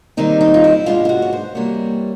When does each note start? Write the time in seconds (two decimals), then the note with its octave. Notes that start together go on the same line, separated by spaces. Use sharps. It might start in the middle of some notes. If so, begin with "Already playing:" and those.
0.17 D#2 D#3 G3 C4 D#4
0.41 D#4
0.54 F4
0.64 E4
0.86 G#2 F3 G#3 B3 D4 F4
1.05 F4
1.09 F#4
1.22 C#5
1.33 C5
1.55 C3 E3 G3 A#3 C#5